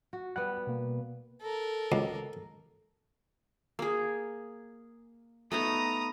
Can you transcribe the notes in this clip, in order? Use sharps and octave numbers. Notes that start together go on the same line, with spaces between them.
F#4
G3 B3 F#5 F#6
B2 A#3
A4 A#4
C#2
A#3 G#4
A3 B3 D#4 A#5 D#6